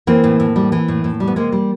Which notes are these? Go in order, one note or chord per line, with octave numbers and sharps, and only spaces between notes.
E3 A#3 C4
A2
A2
G3
E3
A2
A2
G3
B3
C3 G#3 A#3
G3